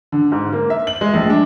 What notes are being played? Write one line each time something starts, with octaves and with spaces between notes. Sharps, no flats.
D3
G#2
A#3
E5
F#7
G#3
A#1
D4